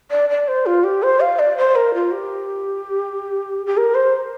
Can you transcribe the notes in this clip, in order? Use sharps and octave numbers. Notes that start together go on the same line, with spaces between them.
D5
D5
C5
F4
G4
C5
F5
D5
C5
A#4
F4
G4
G4
A#4
C5